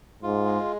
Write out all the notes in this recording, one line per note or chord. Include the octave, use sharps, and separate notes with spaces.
G#2 F4
G#3